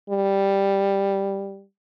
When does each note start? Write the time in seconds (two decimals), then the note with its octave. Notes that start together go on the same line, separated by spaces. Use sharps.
0.10 G3